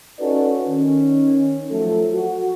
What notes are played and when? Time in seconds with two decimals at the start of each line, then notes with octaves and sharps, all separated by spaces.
0.19 C#4 D#4 F#4 A4 B4 D5
0.67 D#3 C#4
1.71 F3 F#3 A3 A4
2.13 F#4